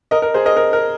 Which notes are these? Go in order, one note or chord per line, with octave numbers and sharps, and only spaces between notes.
A#4 D#5
A#4
G#4 C5
A#4 D#5
A#4
A#4